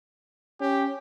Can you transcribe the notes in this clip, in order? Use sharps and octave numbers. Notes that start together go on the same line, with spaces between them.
C#4 G4